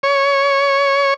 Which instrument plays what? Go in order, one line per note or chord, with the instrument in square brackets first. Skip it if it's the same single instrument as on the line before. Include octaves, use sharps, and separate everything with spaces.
[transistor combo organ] C#5